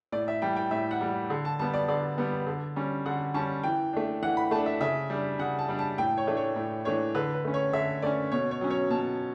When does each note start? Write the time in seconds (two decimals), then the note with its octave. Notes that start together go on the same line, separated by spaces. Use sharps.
0.12 A2 D5
0.28 E5
0.42 E3 G3 G5
0.57 G5
0.71 A2 E5
0.91 F#5
1.01 E3 G3
1.30 D3
1.45 A5
1.59 G3 B3 A5
1.74 D5
1.88 D3 D5
2.18 G3 B3
2.47 D3
2.76 G3 C#4
3.06 D3 F#5
3.34 G3 C#4 A5
3.63 E3 G5
3.93 A3 D4
4.22 E3 F#5
4.37 B5
4.51 A3 D4 A5
4.66 E5
4.80 C#3 E5
5.10 G3 D4
5.39 C#3 F#5
5.59 A5
5.69 G3 D4
5.79 A5
5.98 A2 G5
6.17 C#5
6.27 E3 A3 D4
6.37 C#5
6.56 A2
6.85 E3 A3 D4 C#5
7.15 D3 B4
7.34 B4
7.44 A3 C#4
7.54 C#5
7.73 D3 E5
8.02 A3 C#4 D5
8.32 B2 C#5
8.51 C#5
8.61 F#3 C#4
8.70 C#5
8.90 B2 A5